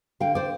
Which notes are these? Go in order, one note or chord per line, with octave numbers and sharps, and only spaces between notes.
D3 F5 G5
C5 D5